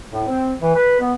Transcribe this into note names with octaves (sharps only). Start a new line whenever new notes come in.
A2
C4
E3
B4
B3